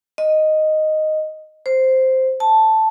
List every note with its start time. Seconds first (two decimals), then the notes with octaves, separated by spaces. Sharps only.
0.18 D#5
1.66 C5
2.40 A5